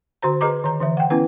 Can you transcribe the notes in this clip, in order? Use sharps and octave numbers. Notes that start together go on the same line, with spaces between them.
D3 F#4 C5 A#5
G#4 B4 D#5 A#5 D6
D#3 A#5
D3 E3 E5
F#5 G5
B3 C#4 E4 B4